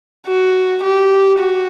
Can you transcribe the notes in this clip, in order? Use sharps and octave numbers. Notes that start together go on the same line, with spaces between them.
F#4
G4
F#4